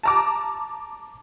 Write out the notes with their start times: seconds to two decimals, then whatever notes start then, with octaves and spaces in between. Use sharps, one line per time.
0.03 A5 A#5 D6